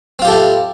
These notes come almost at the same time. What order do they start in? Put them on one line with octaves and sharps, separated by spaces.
C4 F4 G4 A4 E4